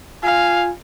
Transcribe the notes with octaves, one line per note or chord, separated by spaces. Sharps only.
F4 F5 G#5